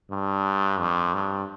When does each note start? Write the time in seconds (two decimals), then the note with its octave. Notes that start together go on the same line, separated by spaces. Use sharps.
0.11 G2
0.80 F2
1.14 G2